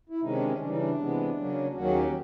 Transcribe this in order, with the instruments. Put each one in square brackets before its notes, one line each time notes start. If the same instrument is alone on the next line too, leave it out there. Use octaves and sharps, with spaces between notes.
[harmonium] E4
C3 D#3 G#3 C#4 D#4
D4
C#4
C#3 E3 G3 D4
D#4
D4
C3 E3 G#3 B3
C#3 F#3 A#3 C#4
D#2 D#3 F#3 A#3 C#4 F#4
G#4
G4